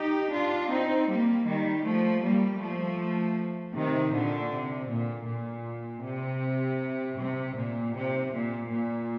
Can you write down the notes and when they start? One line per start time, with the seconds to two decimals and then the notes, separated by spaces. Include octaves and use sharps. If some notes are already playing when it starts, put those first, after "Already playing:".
Already playing: D#4 G4
0.32 D4 F4
0.69 C4 D#4
1.08 G3 A#3
1.46 D#3 G3
1.84 F3 A3
2.22 G3 A#3
2.60 F3 A3
3.74 C3 D#3
4.12 A#2 D3
4.51 C3
4.89 A#2
5.27 A#2
6.03 C3
7.17 C3
7.55 A#2
7.94 C3
8.32 A#2
8.69 A#2